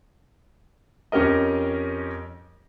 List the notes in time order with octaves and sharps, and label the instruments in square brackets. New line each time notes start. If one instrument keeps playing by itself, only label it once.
[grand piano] F2 C#4 G4 A#4 D#5